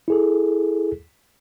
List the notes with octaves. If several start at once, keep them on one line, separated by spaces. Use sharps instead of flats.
E4 G#4 A4